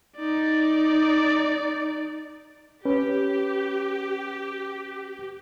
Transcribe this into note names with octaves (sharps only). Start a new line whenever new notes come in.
D#4 D5
C#4 G4 B4